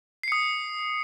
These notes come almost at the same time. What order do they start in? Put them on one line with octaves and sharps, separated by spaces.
C7 C#7 D#6